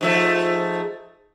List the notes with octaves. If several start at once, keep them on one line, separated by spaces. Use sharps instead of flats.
G#2 F3 A3